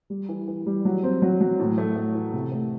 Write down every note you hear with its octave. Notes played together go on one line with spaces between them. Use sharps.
G3
E3
E3
G3
F#3
C4
F#3
F#3
A2
A3
A3
E3
C3
A3